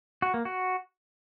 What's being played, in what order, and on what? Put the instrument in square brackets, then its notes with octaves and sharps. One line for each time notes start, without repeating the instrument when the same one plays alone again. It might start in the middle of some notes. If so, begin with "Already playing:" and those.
[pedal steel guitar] F#4
A#3
F#4